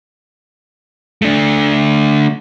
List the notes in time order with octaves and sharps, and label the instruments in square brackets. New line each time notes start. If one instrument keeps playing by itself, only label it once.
[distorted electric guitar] A3 D4